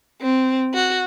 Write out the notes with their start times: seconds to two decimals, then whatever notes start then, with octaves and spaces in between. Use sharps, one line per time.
0.21 C4
0.74 F#4